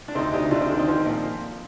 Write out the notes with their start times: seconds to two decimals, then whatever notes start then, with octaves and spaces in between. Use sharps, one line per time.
0.08 D4
0.15 D2 C4 D#4
0.33 D2 D#4 G4
0.51 D2 D4 F4
0.61 C4 D#4
0.69 D#3 D4
0.79 C4 D#4
0.88 F3
1.06 A#2